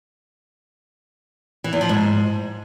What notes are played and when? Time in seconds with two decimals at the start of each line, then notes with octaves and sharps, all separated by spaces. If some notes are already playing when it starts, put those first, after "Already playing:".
1.64 E3
1.73 E2
1.81 F3
1.89 G#2